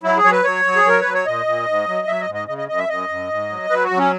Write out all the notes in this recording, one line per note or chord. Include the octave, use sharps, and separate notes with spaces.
F#3 E4
G#4
F#3 C#5
B4
F#3 C#5
F#3
G#4
F#3 A#4
F#3 B4
C#5
A#2 D#5
A#2
G#2
F#3
F#3 E5
D#5
G#2
D#5
C#3 D#5
D#5
F#2 D#5
E5
F#2 D#5
F#2
G#2
F#3
F#3 B4
F#4
F#3
C#4